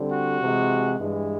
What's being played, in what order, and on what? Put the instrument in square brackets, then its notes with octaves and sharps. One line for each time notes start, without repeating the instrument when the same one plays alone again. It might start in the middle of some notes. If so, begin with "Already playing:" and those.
Already playing: [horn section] D3 G3 C4
F#4
C3 E3 G#3
G2 E3 G#3